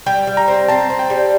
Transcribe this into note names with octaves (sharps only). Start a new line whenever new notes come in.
G3 G5
G3
A#5
C4
C4 A5
C4
G5
G3